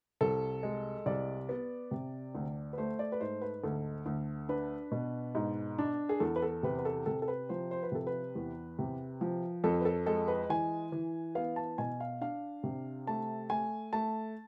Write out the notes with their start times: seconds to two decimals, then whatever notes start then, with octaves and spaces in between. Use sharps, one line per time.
0.21 C2 A4
0.63 G#3
1.06 C2 D5
1.49 B3
1.91 C3
2.35 D2
2.73 B4
2.78 A3 C5
2.99 D5
3.12 B4
3.21 G#2 C5
3.42 B4
3.63 D2 A4
4.06 D2
4.49 D4 B4
4.91 B2
5.35 G#2
5.78 D4
6.09 G#4
6.20 E2 A4
6.36 B4
6.42 A4
6.63 C3 B4
6.78 B4
6.85 A4
7.06 C3 A4
7.22 A4
7.28 B4
7.49 F3 C5
7.71 C5
7.83 B4
7.92 C3 A4
8.07 B4
8.35 E2
8.79 C3
9.21 F3
9.64 F2 A4
9.81 B4
9.85 A4
10.06 G#3 A4
10.28 B4
10.49 E3 G#5
10.92 E3
11.35 B3 F5
11.56 A5
11.78 B2 G#5
12.00 F5
12.21 D4 F5
12.64 C3
13.07 A3 A5
13.50 A3 G#5
13.93 A3 A5